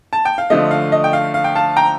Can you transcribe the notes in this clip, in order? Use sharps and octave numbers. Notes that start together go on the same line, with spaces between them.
A5
G5
F5
D3 F3 A3 D#5
F5
D#5
G5
F5
F5
G5
F5 A5
G5 A#5